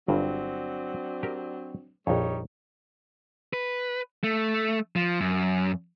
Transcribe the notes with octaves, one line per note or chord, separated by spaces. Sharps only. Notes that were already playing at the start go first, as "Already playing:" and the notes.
G1 G2 F#3 C4 D4
G4 A#4
A#1 F2 G3 D#4 C#5
B4
A3
F3
F#2